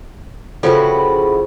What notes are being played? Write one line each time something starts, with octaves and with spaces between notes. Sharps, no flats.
C#3 F3 B3 E4 F#4 G4 A4